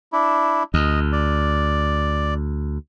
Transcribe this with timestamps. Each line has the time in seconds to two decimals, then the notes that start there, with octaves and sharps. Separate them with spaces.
0.13 D4 E4
0.74 D2 D#5
1.12 D5